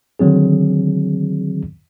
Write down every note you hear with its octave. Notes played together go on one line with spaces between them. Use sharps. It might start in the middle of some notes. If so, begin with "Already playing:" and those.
D3 D#3 F#3 C4 G#4